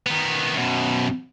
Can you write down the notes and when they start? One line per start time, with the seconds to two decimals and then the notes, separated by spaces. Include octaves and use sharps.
0.06 D#3 B3
0.55 F#2 B2